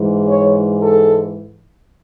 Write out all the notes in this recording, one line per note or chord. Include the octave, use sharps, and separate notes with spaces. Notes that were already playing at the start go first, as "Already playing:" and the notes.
Already playing: G#2 E3 G#3
C#5
A4